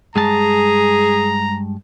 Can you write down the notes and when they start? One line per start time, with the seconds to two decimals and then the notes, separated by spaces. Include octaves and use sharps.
0.16 G2 G#3 G#4 A5 A#5